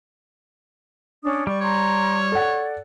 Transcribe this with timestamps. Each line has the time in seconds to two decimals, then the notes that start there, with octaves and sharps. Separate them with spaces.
1.24 C#4 D4 D#6
1.47 G3 D5 C#6
1.61 C#5 A#5 C6
2.32 A4 D5 F#5